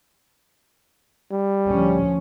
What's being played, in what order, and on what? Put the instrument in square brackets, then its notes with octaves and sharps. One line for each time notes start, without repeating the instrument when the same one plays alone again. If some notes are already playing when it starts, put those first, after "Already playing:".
[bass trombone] G3
[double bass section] D2 F3 C#4